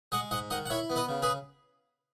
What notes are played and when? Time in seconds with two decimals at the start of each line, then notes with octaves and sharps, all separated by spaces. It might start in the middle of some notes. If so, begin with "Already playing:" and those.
0.12 G#3 D#5 F#5
0.31 G#2 D#5 F#5
0.50 D#3 D#5 F#5
0.66 F#5
0.70 E4 C#5 E5
0.90 B3
0.96 B4 D#5
1.09 C#3
1.22 G#4 B4